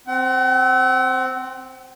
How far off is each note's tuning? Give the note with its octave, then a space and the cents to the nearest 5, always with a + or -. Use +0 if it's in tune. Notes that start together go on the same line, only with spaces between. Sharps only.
C4 +0 F#5 +40